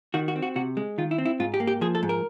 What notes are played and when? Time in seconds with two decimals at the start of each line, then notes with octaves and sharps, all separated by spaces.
0.14 D#3 F#4
0.28 F#4
0.36 C4
0.43 F#4
0.56 C3 F#4
0.77 G#3
0.98 D#3 F4
1.11 E4
1.18 C4
1.25 E4
1.40 G#2 F4
1.54 G4
1.60 A#3
1.67 G4
1.81 F3 G#4
1.95 A4
2.03 G#2
2.09 A#4